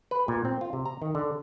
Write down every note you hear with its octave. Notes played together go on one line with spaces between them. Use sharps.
B4
A#2
C4
F4
C3
A#5
D#3
D3